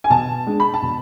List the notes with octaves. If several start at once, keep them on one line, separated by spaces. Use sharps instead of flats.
G#5
B2 A5
G#3 D4
B5
A5
B2